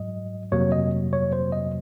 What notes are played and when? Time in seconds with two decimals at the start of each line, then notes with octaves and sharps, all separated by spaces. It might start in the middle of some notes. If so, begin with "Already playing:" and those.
Already playing: G#2 F#3 D#5
0.52 F2 C3 F#3 A#3 C#5
0.72 D#5
1.13 C#5
1.33 C5
1.52 D#5